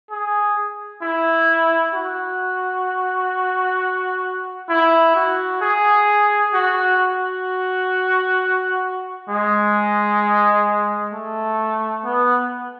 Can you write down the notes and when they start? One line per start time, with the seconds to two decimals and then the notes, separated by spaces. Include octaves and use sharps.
0.11 G#4
1.02 E4
1.95 F#4
4.70 E4
5.15 F#4
5.61 G#4
6.53 F#4
7.00 F#4
9.29 G#3
11.13 A3
12.05 B3